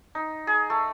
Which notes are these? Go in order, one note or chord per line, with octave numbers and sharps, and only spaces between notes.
D#4
G#4
A3